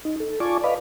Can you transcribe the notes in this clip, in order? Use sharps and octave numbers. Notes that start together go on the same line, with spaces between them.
D#4
A4
F4 D5 G#5 A5 C#6 D6
B4 D5 D#5 F5 B5